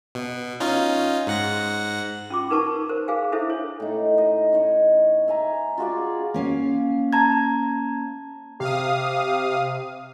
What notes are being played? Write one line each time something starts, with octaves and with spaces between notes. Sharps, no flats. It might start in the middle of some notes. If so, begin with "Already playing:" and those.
B2
C#4 D#4 F4
G#2 F#5 A#6
C#4 F4 D6
D#4 A#4 B4 A5 C#6
A#4 C5
G#4 F5 G#5
D4 E4 A4 C5 E5
C#5
A2 D#4
D#5
D#4 C#5
E5 G#5 A#5
F4 F#4 G#4 D5
A#3 C#4 F5
A5 A#5 G#6
C3 G4 F5 D#6